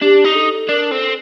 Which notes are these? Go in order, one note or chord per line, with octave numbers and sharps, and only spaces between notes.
D4 G4
D#4
A4
D4 A#4
C4 A4